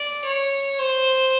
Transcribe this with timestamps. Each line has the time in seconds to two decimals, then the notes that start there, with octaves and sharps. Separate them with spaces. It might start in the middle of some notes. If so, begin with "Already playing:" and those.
Already playing: D5
0.25 C#5
0.79 C5